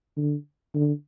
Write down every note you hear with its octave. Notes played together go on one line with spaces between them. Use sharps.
D3
D3